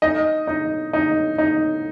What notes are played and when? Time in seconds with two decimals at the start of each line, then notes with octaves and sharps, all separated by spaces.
0.02 D#4 D#5
0.47 D#4
0.93 D#4
1.38 D#4